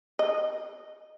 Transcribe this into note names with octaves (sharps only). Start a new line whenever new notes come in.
D#5